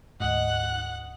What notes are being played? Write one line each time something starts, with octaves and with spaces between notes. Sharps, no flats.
D2 G#2 D#5 F#5 F#6